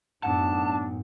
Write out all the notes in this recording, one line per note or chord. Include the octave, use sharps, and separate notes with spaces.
F#2 A2 B3 D4 D#4 F#5 A5